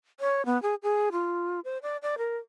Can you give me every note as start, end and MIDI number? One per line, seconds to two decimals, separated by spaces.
0.20 0.45 73
0.46 0.60 59
0.62 0.75 68
0.83 1.09 68
1.12 1.60 65
1.64 1.78 72
1.82 1.97 74
2.02 2.15 74
2.18 2.37 70